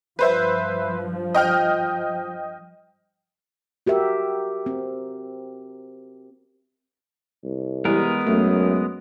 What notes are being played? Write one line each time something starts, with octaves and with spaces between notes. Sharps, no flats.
G2 F3 B4 C5 E5
D#5 G5 F6
F#4 G4 A#4 E5
C4
C2
E3 G3 G#3 B3 A#4
F#2 A3